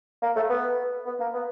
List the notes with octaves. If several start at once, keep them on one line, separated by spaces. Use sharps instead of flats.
A#3
A3
B3
B3
A#3
B3